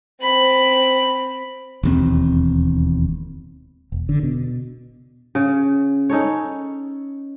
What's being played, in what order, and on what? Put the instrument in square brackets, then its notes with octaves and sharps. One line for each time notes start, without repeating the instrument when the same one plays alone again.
[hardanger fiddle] C4 B5
[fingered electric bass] E1 D#2 C4
[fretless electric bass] E1
D3
B2
[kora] C#3
C#4 D#4 A4 C#5